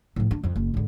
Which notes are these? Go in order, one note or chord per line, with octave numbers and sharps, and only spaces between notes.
A2 F3
D4
F2 F3
F#1
G#2 D3